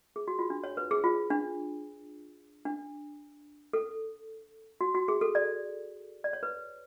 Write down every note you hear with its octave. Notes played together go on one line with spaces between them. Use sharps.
G#4
F#4
F4
D4
C#5
B4
G#4
F4
D4
D4
A4
F#4
F#4
G#4
A4
D5
D5
C#5
B4